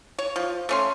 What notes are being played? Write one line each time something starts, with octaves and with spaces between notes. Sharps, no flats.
C#5
F3
A3 C#4 C6